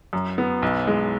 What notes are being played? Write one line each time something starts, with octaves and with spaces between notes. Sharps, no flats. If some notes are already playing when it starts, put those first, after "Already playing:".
F#2
B3
B1
G#3